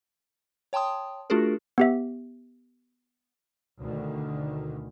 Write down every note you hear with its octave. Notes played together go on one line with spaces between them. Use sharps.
C#5 G5 A5 C6 D#6
A3 D4 F4 F#4 G#4 A#4
B3 G4 E5
D2 B2 D3 D#3